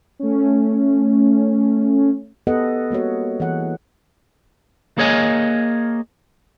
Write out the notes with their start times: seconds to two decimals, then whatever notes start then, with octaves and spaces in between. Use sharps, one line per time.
0.19 A3 C#4
2.47 B3 G4 A4 B4 D#5 F#5
2.91 G3 A#3 F#4 C#5
3.40 E3 G#4 C#5 F#5
4.98 A#3 G#4 C#5 D#5 G#5